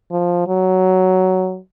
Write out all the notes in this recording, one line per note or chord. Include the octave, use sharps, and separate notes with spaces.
F3
F#3